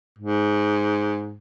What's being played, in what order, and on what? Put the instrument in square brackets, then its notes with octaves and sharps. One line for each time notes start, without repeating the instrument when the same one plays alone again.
[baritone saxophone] G#2